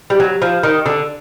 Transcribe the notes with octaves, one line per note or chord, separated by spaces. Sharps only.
G3
F#3
F3
D#3
D3